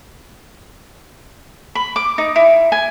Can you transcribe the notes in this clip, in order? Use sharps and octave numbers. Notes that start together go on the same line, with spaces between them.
B5
D6
D#4
E4
G#5